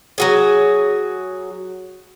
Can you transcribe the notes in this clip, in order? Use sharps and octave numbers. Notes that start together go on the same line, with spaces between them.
F#3 F#4 G#4